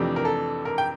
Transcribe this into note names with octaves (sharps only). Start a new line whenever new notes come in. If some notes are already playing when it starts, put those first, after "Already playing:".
Already playing: F2 C3 E3 A3 D4 G4
A#4
A4
A#4
G5